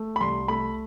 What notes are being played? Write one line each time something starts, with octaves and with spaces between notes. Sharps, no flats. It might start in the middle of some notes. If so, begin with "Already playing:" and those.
Already playing: A3
B5
C2 C6
A3 B5